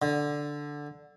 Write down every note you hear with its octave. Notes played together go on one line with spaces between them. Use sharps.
D3